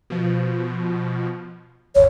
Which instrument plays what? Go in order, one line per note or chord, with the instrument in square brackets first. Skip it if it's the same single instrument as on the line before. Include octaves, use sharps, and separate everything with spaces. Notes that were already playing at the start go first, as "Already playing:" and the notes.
[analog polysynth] B2 F3
[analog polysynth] G#1 E2 [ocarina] C#5